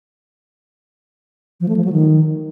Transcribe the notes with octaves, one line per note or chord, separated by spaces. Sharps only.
F3
A3
F3
F#3
D#3